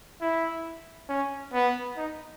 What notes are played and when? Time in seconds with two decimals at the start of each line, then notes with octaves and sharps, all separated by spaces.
0.21 E4
1.09 C#4
1.53 B3
1.97 D#4